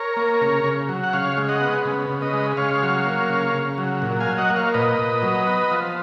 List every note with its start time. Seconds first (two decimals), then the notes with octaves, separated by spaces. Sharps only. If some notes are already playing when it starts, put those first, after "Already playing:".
Already playing: A#4 C#5
0.17 A#3
0.41 C#3
0.64 C#3
0.89 F#3
1.04 F#5
1.13 C#3 C#5 F5
1.37 G#3
1.49 D#5 F#5
1.61 B3
1.85 C#3
2.10 C#3
2.21 B4 D#5
2.34 G#3
2.57 C#3 C#5 F5
2.82 F#3
3.06 A#3
3.29 C#3
3.54 C#3
3.78 F#3
4.02 A#2
4.20 F5 G#5
4.26 F#3
4.38 D#5 F#5
4.50 A#3
4.56 C#5 F5
4.74 A#2 B4 D#5
4.99 A#2
5.23 F#3
5.47 B3
5.71 F3